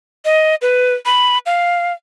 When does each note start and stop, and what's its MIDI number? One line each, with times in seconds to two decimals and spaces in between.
0.25 0.55 75
0.62 0.94 71
1.06 1.38 83
1.46 1.93 77